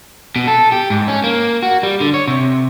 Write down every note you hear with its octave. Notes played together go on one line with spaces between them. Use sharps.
B2
A4
G4
G#2
C#4
A#3
F#4
G3
D3
C#5
C3